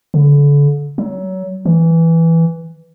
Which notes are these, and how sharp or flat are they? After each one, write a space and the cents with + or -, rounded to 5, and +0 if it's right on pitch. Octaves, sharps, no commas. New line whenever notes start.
D3 -35
F#3 +25
E3 +0